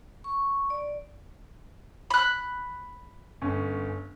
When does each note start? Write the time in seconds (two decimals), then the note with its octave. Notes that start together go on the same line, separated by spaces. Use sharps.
0.24 C#6
0.70 D5
2.10 B5 F#6
3.42 G1 C#4